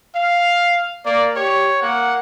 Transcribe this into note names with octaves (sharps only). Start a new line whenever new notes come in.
F5
A#3 D5
G4 C#5
A#3 F#5